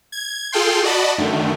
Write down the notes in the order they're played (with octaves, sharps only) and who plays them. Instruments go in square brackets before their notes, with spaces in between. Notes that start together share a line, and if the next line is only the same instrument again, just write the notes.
[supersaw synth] G#6
F4 G#4 A4 F5 G5 C6
F#4 D5 D#5 A5 B5
F#2 D3 D#3 A3